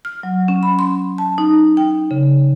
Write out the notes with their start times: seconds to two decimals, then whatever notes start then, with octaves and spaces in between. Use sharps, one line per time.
0.05 F6
0.23 F#3
0.48 C#4
0.63 B5
0.79 C6
1.18 A5
1.38 D#4
1.77 G5
2.11 C#3